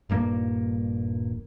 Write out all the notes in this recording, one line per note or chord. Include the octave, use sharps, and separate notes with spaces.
D#1 G2 A#3